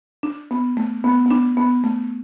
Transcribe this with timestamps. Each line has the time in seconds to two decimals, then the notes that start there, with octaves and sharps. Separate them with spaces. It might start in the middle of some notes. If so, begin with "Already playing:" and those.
0.23 D4
0.51 B3
0.77 A3
1.04 B3
1.26 B3
1.31 D4
1.57 B3
1.84 A3